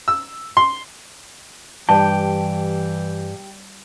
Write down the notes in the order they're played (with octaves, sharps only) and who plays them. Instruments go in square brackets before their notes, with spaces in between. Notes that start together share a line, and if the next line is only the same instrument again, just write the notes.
[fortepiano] E6
C6
[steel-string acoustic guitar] G2 [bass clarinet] E3 [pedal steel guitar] G4 G5 [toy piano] A5